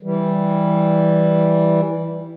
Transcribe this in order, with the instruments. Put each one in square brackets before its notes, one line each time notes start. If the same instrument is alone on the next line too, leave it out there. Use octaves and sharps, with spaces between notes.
[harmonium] E3 G3